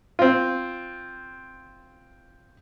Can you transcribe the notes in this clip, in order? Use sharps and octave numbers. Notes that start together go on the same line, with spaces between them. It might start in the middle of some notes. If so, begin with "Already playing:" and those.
C4 F4